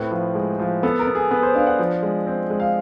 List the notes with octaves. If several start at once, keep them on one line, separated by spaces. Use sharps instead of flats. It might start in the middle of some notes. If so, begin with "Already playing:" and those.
Already playing: A2 C4 B4
F3
G#3
F3
B3 A4
A#4
B3
G#4
B3 B4
C5
D4 F5
F#5
F3
G#3
C4
G#3
F5